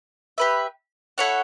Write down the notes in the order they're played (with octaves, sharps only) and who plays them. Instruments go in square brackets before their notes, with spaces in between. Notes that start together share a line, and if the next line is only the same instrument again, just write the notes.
[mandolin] G4 B4 E5
E4 A4 C#5 F#5